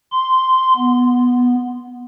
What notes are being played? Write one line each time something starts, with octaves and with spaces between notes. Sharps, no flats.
C6
B3